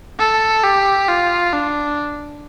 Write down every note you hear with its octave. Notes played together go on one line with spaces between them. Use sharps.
A4
G4
F4
D4